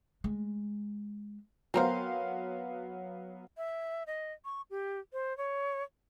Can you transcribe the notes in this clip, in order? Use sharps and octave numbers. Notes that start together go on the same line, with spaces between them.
G#3
F#3 B3 C4 A#4 C5 F5
E5
D#5
C#6
G4
C5
C#5